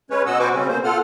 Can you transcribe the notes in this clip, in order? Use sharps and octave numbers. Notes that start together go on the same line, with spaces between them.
G#3 C#4 B4 C#5
B2 D#5 F#5 E6
F#4 B4 C5 G#5 C#6 D6
C#3 G3 C4 C#4
B2 A#3 C5
F4 A4 F#5 F6